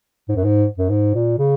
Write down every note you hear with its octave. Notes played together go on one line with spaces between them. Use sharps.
G#2
F#2
G#2
F#2
G#2
A#2
C#3